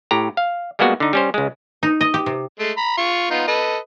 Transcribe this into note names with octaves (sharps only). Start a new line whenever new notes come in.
A2 G4 A#5
F5
G3 G#3 A#3 B3 F#4
D3 D#4
G3 C#4 C5
C#2 G#3
D#4
D#5
G4
C3
G#3 A3
A#5 B5
F4 C#6
B3 D#4 F4
A4 B4 D#5